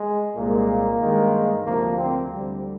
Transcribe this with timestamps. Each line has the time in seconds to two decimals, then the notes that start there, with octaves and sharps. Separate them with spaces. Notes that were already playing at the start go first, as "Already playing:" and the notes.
Already playing: G#3
0.35 C2 A#2 G#3 A#3
1.00 G2 D#3 G#3
1.64 D2 C3 F3 A#3
1.96 C4
2.28 D2 D3 G3